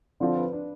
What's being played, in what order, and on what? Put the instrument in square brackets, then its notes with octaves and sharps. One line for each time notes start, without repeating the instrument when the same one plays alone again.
[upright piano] D3 F3 C4 F4 [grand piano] D5
[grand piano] B4
D4